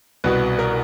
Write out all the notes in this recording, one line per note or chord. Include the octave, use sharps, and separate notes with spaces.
C2 B2 B4
A#4